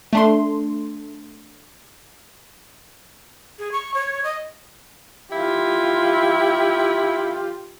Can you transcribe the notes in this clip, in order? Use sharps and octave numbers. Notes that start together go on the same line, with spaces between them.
A3 D4 C6
G#4
C#6
C#5
D#5
E4 F4 G4